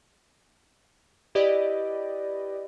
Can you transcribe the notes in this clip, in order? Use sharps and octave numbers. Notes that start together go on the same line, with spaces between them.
E4 G4 B4 D5 D#5